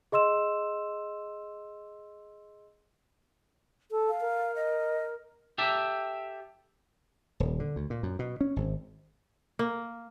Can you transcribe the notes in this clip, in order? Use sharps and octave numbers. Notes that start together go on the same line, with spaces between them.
G#4 D#5 C6 E6 E7
A4
F5
A#4
D#5
G4 A4 E5
D#1
D3
D2
A#2
F#2
B2
C#4
G#1
A#3